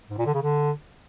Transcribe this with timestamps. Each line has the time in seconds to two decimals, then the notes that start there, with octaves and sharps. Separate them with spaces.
0.10 G#2
0.18 A#2
0.26 D3
0.34 C#3
0.42 D3